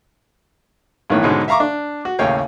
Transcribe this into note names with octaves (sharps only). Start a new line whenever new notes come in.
A1 G2 D#3 E3 B3 C#5
G#2 B2 D3 G#3 C#4 D#4
E5 F5 A#5 C#6 D6
D4
F#4
A1 D#2 C#3 C#5 F5 G5